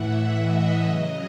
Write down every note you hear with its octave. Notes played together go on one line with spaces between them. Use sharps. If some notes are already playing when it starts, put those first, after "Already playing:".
Already playing: A2 E3 E5 F#5
D#5
C#3 F#3 D#5